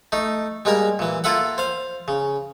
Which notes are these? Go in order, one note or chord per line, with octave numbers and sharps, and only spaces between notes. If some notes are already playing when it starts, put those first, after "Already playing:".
A3 D#4
G3 G#3 A#3 A#4
A#2 E3
A#3 F4 A4 E5 F#5
C5 F5
C#3